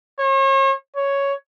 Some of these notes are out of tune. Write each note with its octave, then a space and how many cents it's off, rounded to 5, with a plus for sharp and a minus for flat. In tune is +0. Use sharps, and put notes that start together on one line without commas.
C#5 -40
C#5 +5